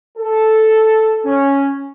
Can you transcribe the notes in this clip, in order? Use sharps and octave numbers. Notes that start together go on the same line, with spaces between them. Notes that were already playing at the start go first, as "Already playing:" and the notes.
A4
C#4